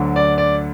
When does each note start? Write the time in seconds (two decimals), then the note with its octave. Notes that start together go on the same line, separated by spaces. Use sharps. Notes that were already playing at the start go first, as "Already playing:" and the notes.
Already playing: D2 D3 F#3
0.16 D5
0.38 D5